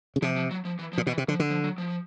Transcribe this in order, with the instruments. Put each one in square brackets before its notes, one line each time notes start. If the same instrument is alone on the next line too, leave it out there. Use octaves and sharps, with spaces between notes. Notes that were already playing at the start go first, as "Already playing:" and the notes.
[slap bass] C#3
[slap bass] C3 [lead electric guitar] F3
[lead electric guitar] F3
F#3
F3
E3
F3
[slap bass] A#2
[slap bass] B2 [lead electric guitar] E3
[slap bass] C3
[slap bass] D3 [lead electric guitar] F3
[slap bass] D3
[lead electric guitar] F3
F#3
F3